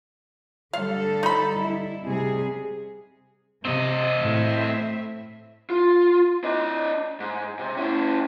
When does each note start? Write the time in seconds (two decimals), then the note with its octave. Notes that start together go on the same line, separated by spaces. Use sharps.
0.73 D3 G3 A4 F5
1.23 D#4 B5
1.62 E4
2.04 C3 G3 G#4
3.65 C3 C4 D#5
4.17 A2 E5
5.70 F4
6.44 D4 D#5
7.20 G#2
7.59 C3
7.77 C#4 E4